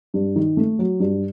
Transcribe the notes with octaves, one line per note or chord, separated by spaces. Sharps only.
G2
D#3
A3
F#3
G2